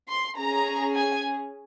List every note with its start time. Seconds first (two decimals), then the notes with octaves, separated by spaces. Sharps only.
0.08 C6
0.37 C#4 G#4 A#5
0.96 G#5